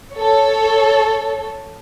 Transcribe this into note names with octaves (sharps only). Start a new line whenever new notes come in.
A4 C#5